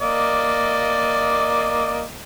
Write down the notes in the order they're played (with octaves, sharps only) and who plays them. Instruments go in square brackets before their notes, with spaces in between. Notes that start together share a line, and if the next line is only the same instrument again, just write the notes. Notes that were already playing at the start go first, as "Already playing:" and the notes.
[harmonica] A#3 D5 D#5